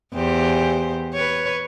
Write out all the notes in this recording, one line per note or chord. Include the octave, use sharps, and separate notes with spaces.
E2 G4 C5
B4 C#5